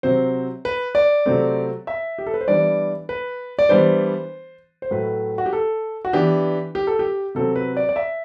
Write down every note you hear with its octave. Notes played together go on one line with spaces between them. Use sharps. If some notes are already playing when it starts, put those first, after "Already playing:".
C3 F#3 C4 C5
B4
D5
C3 F#3 A3 C4
E5
G4
A4
B4
C5
E3 G3 B3 D4 D5
B4
D5
E3 G3 B3 D4 C5
C5
A2 F#3 A3 B4
F#4
G4
A4
F#4
E3 B3 D4 G4
G4
A4
G4
C3 F#3 C4 A4
B4
D5
D5
E5